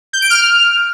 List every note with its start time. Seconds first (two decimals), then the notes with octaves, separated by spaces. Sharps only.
0.13 G6
0.22 D7
0.30 F6